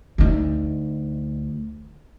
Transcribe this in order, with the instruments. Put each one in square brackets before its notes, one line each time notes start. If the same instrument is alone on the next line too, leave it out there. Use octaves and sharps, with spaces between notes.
[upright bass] D2 D#4